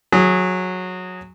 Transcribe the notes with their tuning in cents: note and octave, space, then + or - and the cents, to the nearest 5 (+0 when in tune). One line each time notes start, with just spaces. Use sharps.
F#3 -15 G#4 +0